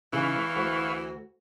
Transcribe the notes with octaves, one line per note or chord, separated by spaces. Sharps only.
C#3 E3 D#4 B4 F5 C#6
E4
D2 F#4